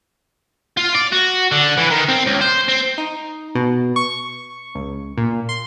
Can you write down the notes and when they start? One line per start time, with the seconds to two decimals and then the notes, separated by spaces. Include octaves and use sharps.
0.77 F4
0.94 D5
1.12 F#4
1.52 D3
1.77 E3
1.91 D#3
2.09 C4
2.26 C#2
2.41 C5
2.68 C4
2.98 D#4
3.55 B2
3.96 C#6
4.75 C#2
5.17 A#2
5.49 C6